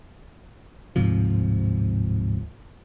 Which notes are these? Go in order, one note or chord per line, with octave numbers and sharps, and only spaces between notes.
D1 G#2 C3 F3